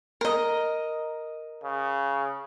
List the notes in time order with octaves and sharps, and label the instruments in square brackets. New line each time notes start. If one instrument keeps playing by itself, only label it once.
[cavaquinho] A#4 D#5
[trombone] C#3